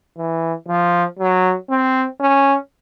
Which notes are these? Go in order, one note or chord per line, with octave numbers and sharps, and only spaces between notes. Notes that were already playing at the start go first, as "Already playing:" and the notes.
E3
F3
F#3
C4
C#4